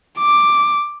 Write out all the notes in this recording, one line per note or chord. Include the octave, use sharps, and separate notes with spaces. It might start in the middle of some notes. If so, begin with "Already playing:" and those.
D6